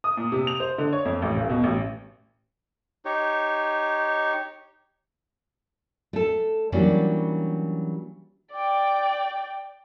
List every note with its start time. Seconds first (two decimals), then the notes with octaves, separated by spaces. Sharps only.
0.04 D#6
0.17 A#2
0.32 C3
0.47 F7
0.60 C5
0.78 D3
0.93 C#5
1.05 F2
1.22 A1
1.36 D#1
1.49 B2
1.64 A1
3.05 D#4 G4 C#5
6.13 A3 A4
6.72 E3 F#3 G3 A#3 C#4 D4
8.52 D5 G5